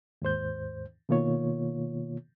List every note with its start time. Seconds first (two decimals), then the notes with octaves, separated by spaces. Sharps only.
0.22 D#2 G#2 C5 G6
1.09 B2 D#3 A#3 F4 C#5